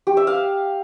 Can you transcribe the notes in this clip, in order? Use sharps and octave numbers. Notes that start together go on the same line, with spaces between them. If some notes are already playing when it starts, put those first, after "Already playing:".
G4
E5
F5